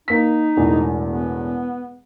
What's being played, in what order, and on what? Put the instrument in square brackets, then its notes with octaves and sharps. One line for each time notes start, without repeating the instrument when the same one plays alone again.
[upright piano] A#3 B6 [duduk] D#4
[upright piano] E1 E2 A2
[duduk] B3